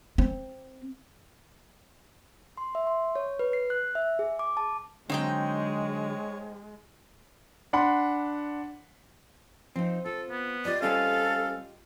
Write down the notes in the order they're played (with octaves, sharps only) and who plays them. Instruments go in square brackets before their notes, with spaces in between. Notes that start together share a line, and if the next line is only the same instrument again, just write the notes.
[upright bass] C4
[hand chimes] C6
E5
C6
C#5
B4
C7
F#6
E5
G#4
D6
A5
[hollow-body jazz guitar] D3 F#3 [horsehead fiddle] G#3 [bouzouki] C4 D#4 G5 [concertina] C#5
[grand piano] D4 F#5 B5 C6
[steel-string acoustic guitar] F3 D#4 [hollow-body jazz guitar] C4
[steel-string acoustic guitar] F4 [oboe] A4
[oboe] B3
[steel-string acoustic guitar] F4 G4 D#5 [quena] D5
[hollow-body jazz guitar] G3 C4 C#4 [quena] A4 [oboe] F5